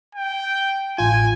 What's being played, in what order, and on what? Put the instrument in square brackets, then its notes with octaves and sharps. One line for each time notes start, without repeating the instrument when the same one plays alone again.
[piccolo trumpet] G5
[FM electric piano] A1 F4 [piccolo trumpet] G#5